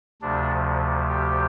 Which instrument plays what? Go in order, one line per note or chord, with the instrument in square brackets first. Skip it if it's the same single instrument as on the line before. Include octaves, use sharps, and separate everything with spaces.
[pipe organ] D2 C3 F3 D4
G4